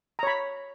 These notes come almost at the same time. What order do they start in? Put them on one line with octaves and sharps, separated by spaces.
A#5 C#5 B5